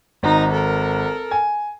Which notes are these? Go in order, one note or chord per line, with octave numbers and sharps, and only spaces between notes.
G#1 D#4 A#5
A4 A#4
G#5